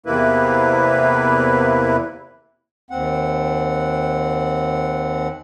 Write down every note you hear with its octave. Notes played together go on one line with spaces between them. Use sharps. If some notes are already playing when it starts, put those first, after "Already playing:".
E2 C3 A#3 E4 B4
D#2 C4 F#5